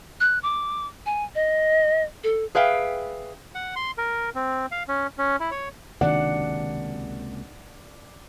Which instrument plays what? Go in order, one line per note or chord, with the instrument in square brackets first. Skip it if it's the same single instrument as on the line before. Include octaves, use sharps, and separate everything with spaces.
[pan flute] F#6
D6
G#5
D#5
A4
[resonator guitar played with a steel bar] G#4 B4 E5 F5 G5
[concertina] F#5
C6
A#4
C4
F5
C#4
C#4
E4
C#5
[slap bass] C#2 C3 A#3 [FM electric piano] D#3 [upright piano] D4 [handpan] F#5